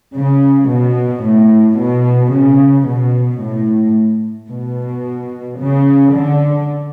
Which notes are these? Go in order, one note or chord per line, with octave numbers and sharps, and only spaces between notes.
C#3
B2
A2
B2
C#3
B2
A2
B2
C#3
D3